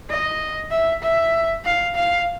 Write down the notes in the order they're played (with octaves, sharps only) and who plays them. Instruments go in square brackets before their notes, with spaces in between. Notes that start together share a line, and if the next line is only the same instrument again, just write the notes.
[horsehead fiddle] D#5
E5
E5
F5
F5